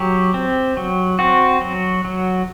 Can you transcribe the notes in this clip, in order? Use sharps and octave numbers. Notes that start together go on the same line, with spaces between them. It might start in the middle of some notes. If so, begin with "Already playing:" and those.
Already playing: F#3 G4
C4
F#3
C4 F#4
F#3
F#3